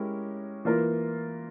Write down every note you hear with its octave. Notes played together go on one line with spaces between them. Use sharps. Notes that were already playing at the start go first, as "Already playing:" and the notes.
Already playing: G#3 C#4 E4 G4 A#4
E3 A#3 F4 A#4